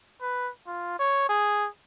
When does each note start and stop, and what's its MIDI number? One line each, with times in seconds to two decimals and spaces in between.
0.21 0.50 71
0.67 0.95 65
0.99 1.24 73
1.29 1.68 68